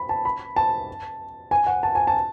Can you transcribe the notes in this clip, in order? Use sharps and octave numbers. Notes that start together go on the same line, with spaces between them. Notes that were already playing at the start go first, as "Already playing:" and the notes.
Already playing: B5
A5
B5
A5
G#5
F#5
A5
G#5
A5